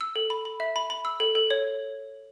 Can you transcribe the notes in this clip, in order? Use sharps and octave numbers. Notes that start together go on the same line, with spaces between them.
E6
A4
B5
B5
E5
B5
B5
E6
A4
A4
C#5